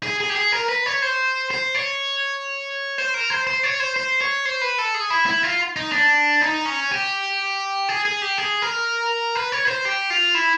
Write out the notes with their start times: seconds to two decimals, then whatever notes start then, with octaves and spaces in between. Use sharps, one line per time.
0.03 G#4
0.20 G#4
0.30 G4
0.36 G#4
0.52 A#4
0.69 B4
0.86 C#5
1.02 C5
1.51 C5
1.75 C#5
2.98 C5
3.14 A#4
3.30 C5
3.47 C5
3.63 C#5
3.80 C5
3.96 C5
4.21 C#5
4.45 C5
4.61 B4
4.78 A4
4.94 G#4
5.10 E4
5.26 E4
5.43 F4
5.76 D#4
5.92 D4
6.41 D#4
6.65 C#4
6.91 G4
7.89 G#4
8.05 G#4
8.22 G4
8.38 G#4
8.62 A#4
9.35 B4
9.52 C#5
9.65 B4
9.68 C5
9.85 G4
10.10 F4
10.34 E4